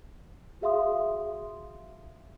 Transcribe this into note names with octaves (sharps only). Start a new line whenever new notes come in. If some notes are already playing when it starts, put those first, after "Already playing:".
F#4 G#4 E5 F5 C6 D#6